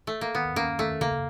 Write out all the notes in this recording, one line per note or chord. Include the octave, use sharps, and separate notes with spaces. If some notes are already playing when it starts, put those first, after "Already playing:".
A3
A#3
D#3 B3
A#3 C#4
D#3 A3
C#3 A#3